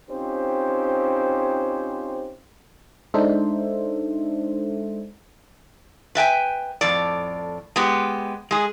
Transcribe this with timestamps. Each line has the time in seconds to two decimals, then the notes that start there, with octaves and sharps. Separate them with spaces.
0.10 C4 C#4 D#4 F4 G4 C5
3.14 G#3 D4 D#4 A4 C5 E5
6.15 B4 E5 G5 G#5
6.81 F2 A2 D5
7.76 G#3 B3 G4
8.51 G#3 G#4